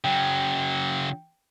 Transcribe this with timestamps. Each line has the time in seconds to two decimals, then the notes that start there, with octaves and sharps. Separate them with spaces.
0.04 C#3 F#3 G5